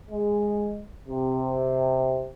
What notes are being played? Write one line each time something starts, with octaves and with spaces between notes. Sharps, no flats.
G#3
C3